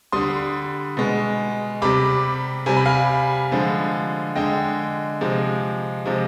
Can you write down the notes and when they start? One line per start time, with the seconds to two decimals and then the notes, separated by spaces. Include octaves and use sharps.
0.12 D3 G3 C6 D#6
0.97 B2 G#3
1.82 C3 G3 B5 D6
2.66 C3 G3 G#5
2.77 B5
2.86 F5 G#5
3.52 D3 F3 G#3
4.36 D3 G#3 D#5 G5
5.21 C3 F3 G#3
6.06 C3 F3 G#3